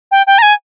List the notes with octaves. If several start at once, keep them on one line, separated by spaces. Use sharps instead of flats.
G5
G5
A#5
G#5